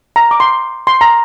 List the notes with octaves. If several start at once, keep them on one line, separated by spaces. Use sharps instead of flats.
A#5
D6
C6
C6
A#5